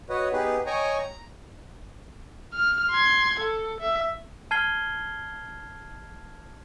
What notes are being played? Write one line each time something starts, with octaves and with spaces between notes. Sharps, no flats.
F#4 B4 C#5 D#5 F#5
B3 D#4 G4 G#4 B4
C#5 D#5 G5 G#5 A#5 C#6
A#5
F6
C6 G#6
A4
E5
A5 F6 G#6 C7 G7